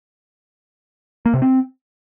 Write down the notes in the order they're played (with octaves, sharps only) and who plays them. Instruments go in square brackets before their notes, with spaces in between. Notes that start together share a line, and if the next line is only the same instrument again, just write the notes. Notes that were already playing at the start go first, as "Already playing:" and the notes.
[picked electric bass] A#3
C3
C4